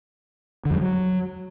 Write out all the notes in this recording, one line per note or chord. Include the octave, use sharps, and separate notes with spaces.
D3
F2
G3
F#3